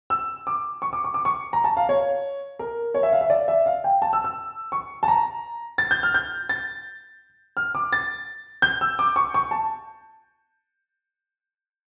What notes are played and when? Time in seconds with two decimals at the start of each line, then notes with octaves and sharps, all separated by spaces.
0.10 E6
0.47 D6
0.82 C#6
0.93 D6
1.04 C#6
1.14 D6
1.25 C#6
1.53 A#5
1.64 A5
1.77 F5
1.89 C#5
2.59 A#4
2.94 C#5
3.03 E5
3.12 F5
3.21 E5
3.30 D5
3.48 E5
3.66 F5
3.84 G5
4.02 A5
4.13 E6
4.24 E6
4.72 C#6
5.03 A5
5.08 A#5
5.78 A6
5.91 G6
6.03 F6
6.14 G6
6.49 A6
7.57 F6
7.75 D6
7.93 A6
8.62 G6
8.81 E6
8.99 D6
9.16 C#6
9.34 C#6
9.51 A5